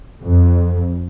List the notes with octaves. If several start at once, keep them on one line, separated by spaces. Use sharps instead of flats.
F2